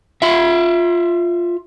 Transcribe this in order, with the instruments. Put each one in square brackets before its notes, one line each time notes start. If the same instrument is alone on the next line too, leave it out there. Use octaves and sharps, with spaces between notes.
[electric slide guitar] F4 E5